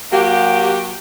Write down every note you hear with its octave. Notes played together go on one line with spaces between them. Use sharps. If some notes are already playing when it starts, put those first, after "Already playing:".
F#3 A#3 F#4 G4